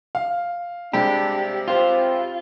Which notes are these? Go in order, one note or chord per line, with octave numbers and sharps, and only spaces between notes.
F5
C3 G3 G#3 D4 G4
C4 F4 G4 C5